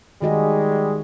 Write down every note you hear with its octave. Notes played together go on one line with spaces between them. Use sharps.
D#3 G3 G#3 F#4 D#5